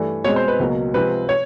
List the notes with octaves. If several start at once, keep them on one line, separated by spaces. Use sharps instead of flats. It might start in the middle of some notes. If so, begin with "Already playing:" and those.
Already playing: G2 E3 A3 D4
B2 G#3 C4 C#5
C5
B4
C#2 B2 F#3 A#3
C3 F3 G#3 C4 B4
C#5